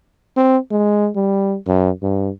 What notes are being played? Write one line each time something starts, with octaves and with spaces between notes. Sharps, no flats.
C4
G#3
G3
F#2
G2